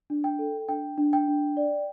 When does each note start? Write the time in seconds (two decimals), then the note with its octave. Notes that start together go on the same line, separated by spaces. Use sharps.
0.10 D4
0.24 G5
0.39 A4
0.68 D4 G5
0.98 D4
1.13 G5
1.28 D4
1.57 D5